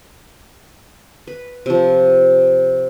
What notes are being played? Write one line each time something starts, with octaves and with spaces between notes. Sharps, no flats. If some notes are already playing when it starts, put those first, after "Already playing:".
B4
C3 F3